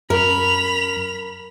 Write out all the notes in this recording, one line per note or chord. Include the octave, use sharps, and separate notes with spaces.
F#2 A#4 B5 F7